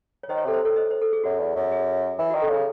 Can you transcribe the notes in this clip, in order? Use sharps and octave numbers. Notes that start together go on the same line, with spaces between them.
C#5
D#3 C5 D#5
C#5
C5
C3 A4
C5
A4 C#5
C5 D#5
C5
A4
G#4
F#2 F#4
E2
F#2
G#4
E3
F#4
D#3
A4
C#3 G#4